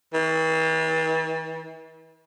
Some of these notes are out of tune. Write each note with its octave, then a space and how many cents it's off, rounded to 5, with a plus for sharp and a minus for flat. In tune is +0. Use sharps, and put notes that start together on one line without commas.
E3 -40